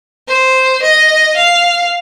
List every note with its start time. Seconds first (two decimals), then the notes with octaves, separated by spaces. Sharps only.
0.28 C5
0.83 D#5
1.36 F5